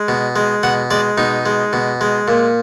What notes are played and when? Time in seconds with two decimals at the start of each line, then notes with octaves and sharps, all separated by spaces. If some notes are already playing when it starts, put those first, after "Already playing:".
Already playing: G#3
0.08 B2
0.36 G#3
0.63 B2 F#5
0.91 G#3 D5
1.18 B2 D#4
1.46 G#3
1.73 B2
2.01 G#3
2.28 A#2